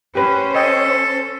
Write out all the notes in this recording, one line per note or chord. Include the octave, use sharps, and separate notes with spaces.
C#4 G4 B4 C5
A4 C#5 D#5 G5